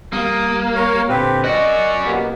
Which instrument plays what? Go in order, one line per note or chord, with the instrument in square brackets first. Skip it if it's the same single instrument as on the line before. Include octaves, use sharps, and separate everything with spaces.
[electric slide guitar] G3 [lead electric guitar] A#3 [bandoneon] D#6
[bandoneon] A#4 C#5 F5
[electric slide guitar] A#2 D3 [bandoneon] C4 G4 B4
[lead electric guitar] C#4 F#4 [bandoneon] D5 [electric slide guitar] D#5
[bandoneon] B2 A#3 B3 [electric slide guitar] G4